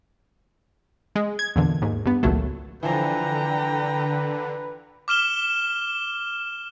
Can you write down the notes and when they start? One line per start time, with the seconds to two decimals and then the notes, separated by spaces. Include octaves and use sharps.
1.16 G#3
1.39 G#6
1.56 E2 A#2 D3
1.82 D#2 G#2
2.06 G2 B3
2.23 G#1 C#2 A#2 F#3 A3
2.83 D3 E3 F3 B4 G5 A#5
5.08 D6 F6 E7 G7